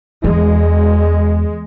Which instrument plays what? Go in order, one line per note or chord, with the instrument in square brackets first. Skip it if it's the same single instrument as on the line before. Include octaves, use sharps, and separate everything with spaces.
[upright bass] E2 [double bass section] G#3